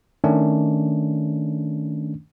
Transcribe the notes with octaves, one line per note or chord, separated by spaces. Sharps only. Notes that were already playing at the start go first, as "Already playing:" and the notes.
D#3 A3 C#4 D4